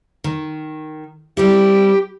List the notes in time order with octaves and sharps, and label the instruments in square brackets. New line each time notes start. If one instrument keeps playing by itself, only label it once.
[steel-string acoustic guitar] D#3
[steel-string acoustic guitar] G3 C4 E4 [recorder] G4